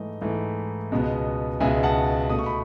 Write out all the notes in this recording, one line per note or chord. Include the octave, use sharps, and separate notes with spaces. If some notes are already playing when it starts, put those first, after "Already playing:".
Already playing: G#2 E3 A3 D#5
G#2 E3 A3
C#2 B2 G#3 B3
C#2 B2 G#3 B3 E5 G#5
F#5 A5
B2 A3 D#6
C#6
B5